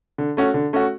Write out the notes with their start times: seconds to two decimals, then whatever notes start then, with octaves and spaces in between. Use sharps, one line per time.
0.18 D3
0.37 A3 C#4 F#4
0.54 D3
0.73 A3 C#4 F#4